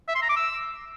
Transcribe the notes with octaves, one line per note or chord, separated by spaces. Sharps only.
E5
C6
A#5
D6
E6